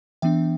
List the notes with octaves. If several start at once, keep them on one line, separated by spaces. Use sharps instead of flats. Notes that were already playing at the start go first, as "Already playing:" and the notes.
E3 B3 D4 E5 G5